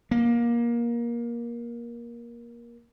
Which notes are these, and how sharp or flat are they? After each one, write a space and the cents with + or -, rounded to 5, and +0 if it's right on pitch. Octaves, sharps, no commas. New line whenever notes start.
A#3 +20